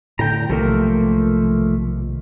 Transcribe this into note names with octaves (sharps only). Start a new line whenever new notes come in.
A2 D3 G5 A#5
B1 C3 D#3 F3 A3 A#3